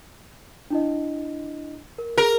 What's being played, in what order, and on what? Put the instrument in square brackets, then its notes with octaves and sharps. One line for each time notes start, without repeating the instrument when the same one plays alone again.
[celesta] D4 E4 D#5
A#4
[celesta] G#4 [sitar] A#4